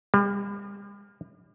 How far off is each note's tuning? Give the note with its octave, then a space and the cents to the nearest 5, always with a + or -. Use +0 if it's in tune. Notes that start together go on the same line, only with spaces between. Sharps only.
G3 +40